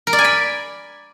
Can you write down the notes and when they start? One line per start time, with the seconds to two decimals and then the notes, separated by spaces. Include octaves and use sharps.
0.07 A#4
0.13 D5
0.19 G#5
0.24 B5